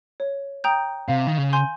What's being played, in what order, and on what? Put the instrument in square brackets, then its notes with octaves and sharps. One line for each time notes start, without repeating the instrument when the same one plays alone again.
[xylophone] C#5
G5 A#5 D#6 G6
[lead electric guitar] C3 [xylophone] F5
[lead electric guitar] D#3
C#3
[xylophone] G#5 C6 G6